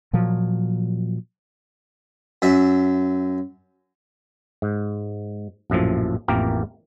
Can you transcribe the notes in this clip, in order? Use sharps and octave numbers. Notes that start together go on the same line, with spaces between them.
A#2 F3 F#3
F#2 E5
G#2
A#1 F#2 A2 F3
A1 F2 E3 A#3 G4 A#4